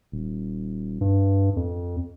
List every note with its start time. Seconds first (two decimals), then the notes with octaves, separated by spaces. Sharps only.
0.12 D#1
1.01 G2
1.56 F2